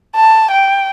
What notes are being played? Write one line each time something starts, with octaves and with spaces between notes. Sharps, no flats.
A5
G5